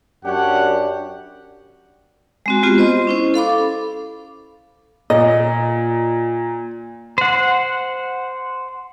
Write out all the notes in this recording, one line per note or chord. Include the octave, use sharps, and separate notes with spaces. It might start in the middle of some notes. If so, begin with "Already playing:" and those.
F#2 D4 G4 C#5 F#5
G#3 C4 F#4
G#3 B3 F4 G4
C5 D#5 C6
C#4 E4 C5
A4 F5 B5 D6
A4
A#2 D#5
C5 F#5